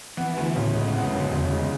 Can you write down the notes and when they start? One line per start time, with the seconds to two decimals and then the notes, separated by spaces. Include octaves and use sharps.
0.17 E3 B3
0.36 D2 E3
0.55 A2 C#3
0.74 A2 G#3
0.94 B3
1.04 F#2
1.13 D2
1.32 E2 C#3
1.51 G#3